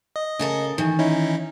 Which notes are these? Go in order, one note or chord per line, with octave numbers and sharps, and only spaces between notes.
D#5
C#3 A4 A#4
D#3 E3
C#4 D#4 E4